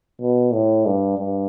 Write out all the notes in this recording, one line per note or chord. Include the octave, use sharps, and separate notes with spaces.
B2
A2
G2
G2